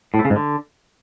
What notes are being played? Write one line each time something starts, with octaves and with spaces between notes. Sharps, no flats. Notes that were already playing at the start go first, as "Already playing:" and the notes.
A2
A3
C#3
G#2
D3